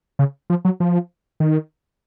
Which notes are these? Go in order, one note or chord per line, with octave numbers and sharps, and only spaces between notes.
C#3
F3
F#3
F3
D#3